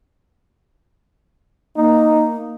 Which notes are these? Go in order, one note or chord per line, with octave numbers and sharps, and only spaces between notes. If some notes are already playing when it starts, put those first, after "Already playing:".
A#3 D#4